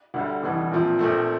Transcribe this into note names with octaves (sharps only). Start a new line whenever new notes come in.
D2 D3 G3
F1 E2 E3 G3
A#1 A#2 F3 C4
A#1 A#2 A3 C4